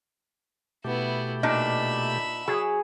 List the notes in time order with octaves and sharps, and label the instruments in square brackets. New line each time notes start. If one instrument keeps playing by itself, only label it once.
[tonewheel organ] B2 A3 G4 [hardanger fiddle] B3 E4
[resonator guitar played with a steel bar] A#2 D4 D#4 [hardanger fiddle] E5 B5
[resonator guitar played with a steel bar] F#3 [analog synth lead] G#4